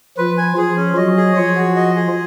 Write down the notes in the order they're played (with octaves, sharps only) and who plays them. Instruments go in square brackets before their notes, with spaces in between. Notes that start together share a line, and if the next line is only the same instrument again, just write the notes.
[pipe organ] F3 F4 [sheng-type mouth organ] B4
[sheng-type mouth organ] G#5
[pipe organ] F3 F4 [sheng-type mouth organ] G#4
[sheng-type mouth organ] C#4
[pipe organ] F#3 F#4 [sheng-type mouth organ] D#5
[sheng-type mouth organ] G#4
[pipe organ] F3 F4 [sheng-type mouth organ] C#5
[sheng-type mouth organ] F#4
D#5
G#4